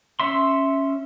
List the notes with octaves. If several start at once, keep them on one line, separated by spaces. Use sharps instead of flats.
C#4 E5 C6